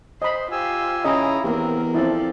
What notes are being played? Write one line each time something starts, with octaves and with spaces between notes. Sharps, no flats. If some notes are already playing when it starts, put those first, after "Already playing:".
C5 D#5 B5
F4 G4 G#5 E6
C#3 E4 G#4 D#5 A#5
E2 A#3 C4 G4 A#4
F3 C4 E4 A4 D5